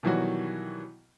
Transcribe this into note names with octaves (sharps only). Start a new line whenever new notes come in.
B2 D#3 E3 F#3 G3 F#4